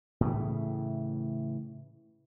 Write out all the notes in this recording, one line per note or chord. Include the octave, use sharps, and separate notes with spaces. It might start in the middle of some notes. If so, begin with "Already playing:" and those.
A2 C#3 E3